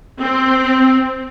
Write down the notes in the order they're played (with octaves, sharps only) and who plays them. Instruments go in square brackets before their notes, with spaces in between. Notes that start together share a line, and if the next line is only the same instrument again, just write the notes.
[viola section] C4